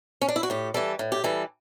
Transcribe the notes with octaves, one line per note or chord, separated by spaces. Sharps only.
C#4
D4
E4
F#4
A2 G4
E3 G3 A4
A2
G4
E3 G3 A4